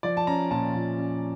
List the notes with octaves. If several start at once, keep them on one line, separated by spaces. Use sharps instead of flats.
F3 D5
A5
C#4 A#5
A#2 A5
A#2
C#4